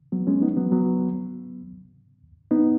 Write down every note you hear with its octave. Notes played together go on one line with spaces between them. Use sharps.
F#3 B3
G#3 C#4
B3 D#4
F#3 B3
F#3 B3
B3 D#4